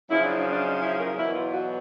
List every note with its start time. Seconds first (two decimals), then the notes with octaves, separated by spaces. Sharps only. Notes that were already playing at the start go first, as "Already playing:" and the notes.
0.10 F#2 C#3 F3 E4
0.23 D4
0.36 D4
0.50 D4
0.63 D#4
0.81 E4
0.98 A#4
1.16 E2 B2 F#3 E4
1.33 F4
1.52 F#4